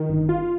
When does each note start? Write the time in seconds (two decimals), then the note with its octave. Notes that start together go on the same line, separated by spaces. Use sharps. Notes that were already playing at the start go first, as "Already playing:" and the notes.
Already playing: D#3
0.09 G1
0.29 F4